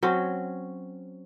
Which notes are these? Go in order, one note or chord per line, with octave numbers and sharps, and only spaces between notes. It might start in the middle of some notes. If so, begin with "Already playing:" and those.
F#3 C4 C#4